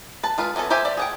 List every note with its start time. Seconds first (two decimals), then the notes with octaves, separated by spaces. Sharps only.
0.23 B4 A5
0.38 G#3 F4 B4
0.56 E3 B3 C#4 A4
0.70 G4 C5 E5 G5 G#5
0.85 D5 E5
0.97 G#4 F#5 G5